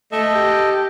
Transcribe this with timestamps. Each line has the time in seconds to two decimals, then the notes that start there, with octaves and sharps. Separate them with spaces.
0.12 A3 A4 D#5
0.34 G4